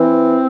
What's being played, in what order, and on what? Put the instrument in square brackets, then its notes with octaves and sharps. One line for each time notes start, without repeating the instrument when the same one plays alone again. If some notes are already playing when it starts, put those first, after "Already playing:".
Already playing: [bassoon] E3 [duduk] C4